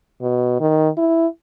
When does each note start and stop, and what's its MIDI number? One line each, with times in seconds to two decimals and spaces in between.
0.21 0.56 47
0.60 0.89 51
0.98 1.27 64